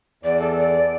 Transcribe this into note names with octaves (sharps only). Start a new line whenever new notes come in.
E2 D5
A4
D5